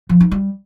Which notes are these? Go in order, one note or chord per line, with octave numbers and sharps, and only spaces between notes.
F3
D#4
G3